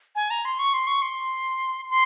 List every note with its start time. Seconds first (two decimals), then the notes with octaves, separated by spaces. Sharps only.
0.16 G#5
0.30 A#5
0.45 C6
0.59 C#6
0.74 C6
0.87 C#6
1.02 C6
1.89 C6